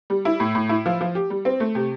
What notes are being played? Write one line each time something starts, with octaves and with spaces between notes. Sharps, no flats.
G3
E4
A2
A2
E4
F3
F3
G4
G3
C4
A3
C3